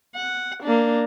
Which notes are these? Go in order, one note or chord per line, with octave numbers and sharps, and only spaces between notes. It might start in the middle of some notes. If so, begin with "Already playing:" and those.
F#5
A#3 D4